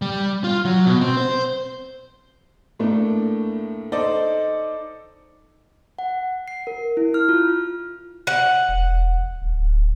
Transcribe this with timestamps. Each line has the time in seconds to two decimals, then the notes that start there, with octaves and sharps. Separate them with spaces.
0.02 G3
0.44 F4
0.65 F#3
0.87 B2
1.01 C4
1.17 C5
2.79 A2 A3 A#3 D4
3.92 D#4 A4 C5 D5 D#5
5.99 F#5
6.48 C7
6.67 A#4
6.97 E4
7.14 F6
7.29 F4
8.27 F#5
8.69 E1
9.42 D1